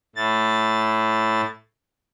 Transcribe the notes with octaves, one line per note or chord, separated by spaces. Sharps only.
A2 A6